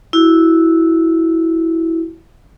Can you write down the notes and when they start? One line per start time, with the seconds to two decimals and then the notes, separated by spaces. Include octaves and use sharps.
0.13 E4 F#4